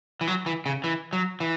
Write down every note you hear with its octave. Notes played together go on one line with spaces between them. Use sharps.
E3
F#3
E3
C#3
E3
F#3
E3